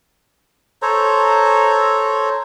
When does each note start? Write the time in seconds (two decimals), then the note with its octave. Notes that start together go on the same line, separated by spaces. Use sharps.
0.82 A4 C5 C#5 A#5